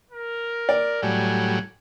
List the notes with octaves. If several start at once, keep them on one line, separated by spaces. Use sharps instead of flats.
A#4
D5
A2 F#3 G3 G#5